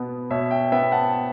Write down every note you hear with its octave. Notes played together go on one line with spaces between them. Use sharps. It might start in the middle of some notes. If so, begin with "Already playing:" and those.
Already playing: B2 B3
B2 C#5 E5
E5 G5
B3 E5 G5
F#5 A5